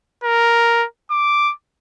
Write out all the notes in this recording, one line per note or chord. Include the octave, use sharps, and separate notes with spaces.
A#4
D6